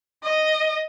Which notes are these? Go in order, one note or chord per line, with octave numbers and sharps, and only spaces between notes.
D#5